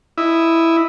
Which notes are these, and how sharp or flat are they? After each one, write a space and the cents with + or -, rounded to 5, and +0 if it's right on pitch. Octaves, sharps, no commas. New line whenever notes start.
E4 +0 D#5 +0